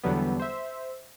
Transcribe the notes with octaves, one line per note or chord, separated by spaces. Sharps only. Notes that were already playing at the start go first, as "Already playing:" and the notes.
E2 D3 F#3 G3 B3
C5 E5